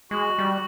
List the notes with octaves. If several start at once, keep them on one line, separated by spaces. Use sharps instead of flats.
G#3 F#4
G3
F#4